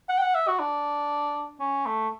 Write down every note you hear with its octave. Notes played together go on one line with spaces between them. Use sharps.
F#5
G5
F#5
E5
F#4
D4
C#4
A3